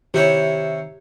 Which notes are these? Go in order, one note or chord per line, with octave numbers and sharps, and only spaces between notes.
C3 D#3 E4 G4 C#5